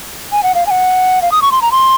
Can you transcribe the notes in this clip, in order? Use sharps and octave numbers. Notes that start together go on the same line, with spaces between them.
G#5
F#5
F5
G#5
F#5
F5
D#6
C#6
C6
A#5
C6